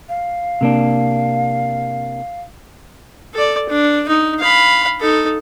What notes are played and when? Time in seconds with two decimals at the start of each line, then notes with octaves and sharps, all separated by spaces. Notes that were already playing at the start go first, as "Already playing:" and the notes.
0.09 F5
0.61 C3 A#3 D4
3.34 A4 D5
3.69 D4
4.08 D#4
4.39 F5 B5
5.01 D#4 A4